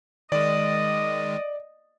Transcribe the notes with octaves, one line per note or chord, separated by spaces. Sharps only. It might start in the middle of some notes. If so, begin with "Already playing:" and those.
D#3 G#3 D5 D#5